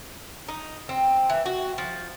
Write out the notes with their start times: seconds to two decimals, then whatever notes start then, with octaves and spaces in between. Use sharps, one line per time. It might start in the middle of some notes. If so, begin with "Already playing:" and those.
0.49 D#4
0.89 C4
1.29 E3
1.46 F#4
1.78 F3